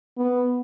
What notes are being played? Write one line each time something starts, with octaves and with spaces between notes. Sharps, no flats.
B3